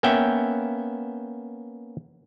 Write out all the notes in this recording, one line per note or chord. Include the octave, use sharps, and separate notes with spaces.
A#3 B3 C#4 E5 G5